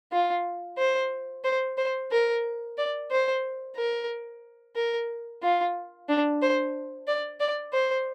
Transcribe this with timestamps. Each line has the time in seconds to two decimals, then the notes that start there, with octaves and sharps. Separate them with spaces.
0.12 F4
0.78 C5
1.44 C5
1.77 C5
2.12 A#4
2.78 D5
3.11 C5
3.76 A#4
4.76 A#4
5.43 F4
6.09 D4
6.42 C5
7.08 D5
7.40 D5
7.73 C5